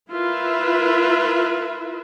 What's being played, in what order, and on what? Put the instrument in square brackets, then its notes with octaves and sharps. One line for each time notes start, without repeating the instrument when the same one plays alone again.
[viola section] E4 F4 A#4 B4 E5